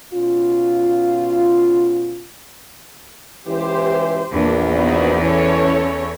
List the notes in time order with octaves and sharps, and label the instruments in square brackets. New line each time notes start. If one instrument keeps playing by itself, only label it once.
[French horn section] B2 C#4 F4
[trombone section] C#2 E3 [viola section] G4 C5
[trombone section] A#1 [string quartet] E2 [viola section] A#3 D4
[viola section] B3 D#4 F#4
[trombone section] E3 [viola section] C#4 A4 C#5